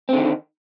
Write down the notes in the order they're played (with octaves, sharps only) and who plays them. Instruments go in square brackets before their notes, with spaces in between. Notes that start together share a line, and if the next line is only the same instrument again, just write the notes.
[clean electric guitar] C4
D3
D#3